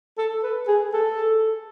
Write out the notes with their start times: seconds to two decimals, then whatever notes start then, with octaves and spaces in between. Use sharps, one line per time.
0.18 A4
0.43 B4
0.68 G#4
0.93 A4